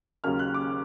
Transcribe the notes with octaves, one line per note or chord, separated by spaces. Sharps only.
D#2 C#3 F#3 A#3 C#4 F6
F#6
D6